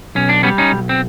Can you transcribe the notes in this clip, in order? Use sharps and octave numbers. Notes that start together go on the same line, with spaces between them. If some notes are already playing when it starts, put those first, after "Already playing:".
B1 C#4
D4
G3 B3 C#4
C#4 D#4
B1
C4